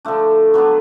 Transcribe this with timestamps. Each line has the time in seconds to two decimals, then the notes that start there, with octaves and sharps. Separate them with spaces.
0.05 D3 F3 A3 D4
0.54 F#3 B3 D4